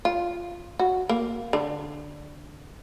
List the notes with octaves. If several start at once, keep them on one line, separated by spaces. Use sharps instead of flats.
F4
F#4
A#3
D3